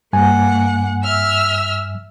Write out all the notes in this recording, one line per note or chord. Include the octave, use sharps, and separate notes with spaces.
G2 A#3 F#5 G#5
E5 E6 F6